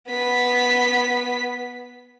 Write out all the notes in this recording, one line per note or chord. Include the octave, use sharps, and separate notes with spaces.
B3 B6